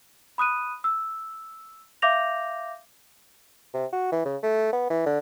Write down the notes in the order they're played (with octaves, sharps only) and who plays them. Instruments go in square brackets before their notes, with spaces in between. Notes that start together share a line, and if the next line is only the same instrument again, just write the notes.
[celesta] B5 D#6 F#6 D#7
E6
E5 F5 D6 G6 A#6 F7
[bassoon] C3
F#4
E3
C#3
A3
B3
E3
D3